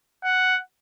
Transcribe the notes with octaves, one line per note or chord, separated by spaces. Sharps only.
F#5